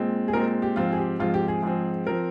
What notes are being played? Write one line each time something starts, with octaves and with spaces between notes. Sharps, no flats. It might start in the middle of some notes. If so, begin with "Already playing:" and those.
Already playing: A#2 G#3 C4
G#4
A#2 G#3 C4 A#4
G4
G#2 F3 C4 F4
G#4
G4
G#2 F3 C4 F4
G4
G#4
G#2 F3 C4
F3 C4 A#4